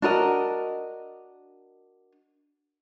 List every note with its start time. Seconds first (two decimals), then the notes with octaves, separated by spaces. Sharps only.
0.02 D4 F#4 A#4 D#5